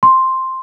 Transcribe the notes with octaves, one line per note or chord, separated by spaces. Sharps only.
C6